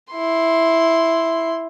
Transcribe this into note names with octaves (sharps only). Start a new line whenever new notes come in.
E4 C6